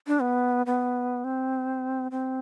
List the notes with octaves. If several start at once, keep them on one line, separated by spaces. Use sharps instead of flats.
D4
B3
B3
C4
C4